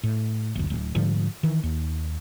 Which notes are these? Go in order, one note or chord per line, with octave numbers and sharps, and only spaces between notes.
A2
F#1 D2
D1
G#2 D3 F3 G3
D#3 E3
D#2